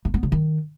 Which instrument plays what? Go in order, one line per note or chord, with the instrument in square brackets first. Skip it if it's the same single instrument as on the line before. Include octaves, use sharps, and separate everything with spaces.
[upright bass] A#3
B3
C#3
D#3